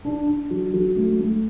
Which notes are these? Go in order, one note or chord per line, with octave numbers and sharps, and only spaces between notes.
D4
D4
F#3
F#3
A3
A3